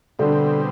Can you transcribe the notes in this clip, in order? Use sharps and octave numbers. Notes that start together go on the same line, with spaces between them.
B2 D3 G3 C4